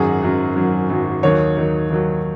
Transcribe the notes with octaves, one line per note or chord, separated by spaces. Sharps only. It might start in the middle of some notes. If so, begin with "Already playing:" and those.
Already playing: G#1 F#2 F#3 G#4
G#1 F#2 F#3
G#1 F#2 F#3
G#1 F#2 F#3
D#2 D#3 F#3 C#5
D#2 D#3 F#3
D#2 D#3 F#3